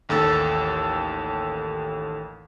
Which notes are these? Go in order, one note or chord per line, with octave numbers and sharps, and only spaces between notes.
A1 D#2 A4 E6 A6